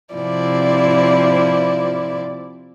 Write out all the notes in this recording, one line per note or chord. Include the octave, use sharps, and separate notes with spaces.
C3 F3 E4 D5